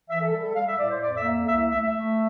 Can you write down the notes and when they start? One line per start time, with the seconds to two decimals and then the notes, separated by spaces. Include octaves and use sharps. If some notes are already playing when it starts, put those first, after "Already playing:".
0.09 E3 E5
0.21 A4
0.32 G3 A4
0.44 A4
0.55 G3 F5
0.67 E5
0.78 A2 D5
0.90 C5
1.01 F2 D5
1.16 E5
1.23 A#3
1.47 C2 E5
1.70 A3 E5
1.82 E5
1.93 A3